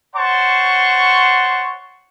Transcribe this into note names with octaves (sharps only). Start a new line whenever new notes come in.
C5 C#5 F#5 A5 C6 C#6